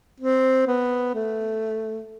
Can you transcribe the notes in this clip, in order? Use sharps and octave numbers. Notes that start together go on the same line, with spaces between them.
C4
B3
A3